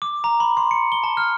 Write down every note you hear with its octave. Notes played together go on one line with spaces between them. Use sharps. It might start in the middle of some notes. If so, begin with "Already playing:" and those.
D6
A#5
B5
C6
C#7
G7
A5
F6